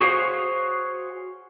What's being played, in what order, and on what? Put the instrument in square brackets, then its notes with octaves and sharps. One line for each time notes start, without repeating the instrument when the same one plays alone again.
[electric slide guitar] F#4 G#4 C5 C#5 F5